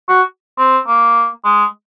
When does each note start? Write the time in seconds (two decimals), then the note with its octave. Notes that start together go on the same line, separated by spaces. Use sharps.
0.09 F#4
0.58 C4
0.87 A#3
1.44 G#3